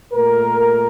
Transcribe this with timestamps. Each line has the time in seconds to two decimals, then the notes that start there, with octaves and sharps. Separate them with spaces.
0.14 A#2 A3 A#4